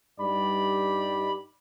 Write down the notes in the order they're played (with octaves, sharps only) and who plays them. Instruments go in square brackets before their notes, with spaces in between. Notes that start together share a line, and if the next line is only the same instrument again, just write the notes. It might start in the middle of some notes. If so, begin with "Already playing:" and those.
[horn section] G2 G3 D#4 G4 D5 B5